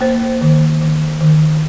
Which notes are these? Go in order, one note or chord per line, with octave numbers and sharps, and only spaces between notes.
A#3 C5
D#3
D#3
D#3